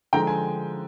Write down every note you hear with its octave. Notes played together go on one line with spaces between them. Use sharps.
D3 F3 G#3 G5 A#5
G#5